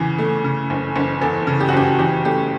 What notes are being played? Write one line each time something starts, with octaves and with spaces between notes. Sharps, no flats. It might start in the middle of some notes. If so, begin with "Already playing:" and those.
Already playing: E2 C#3 E3
A3
C#3
F#1
F#1
E2 A4
C#3
G4
F#4
F#1 G4
E3 G4
A3 G4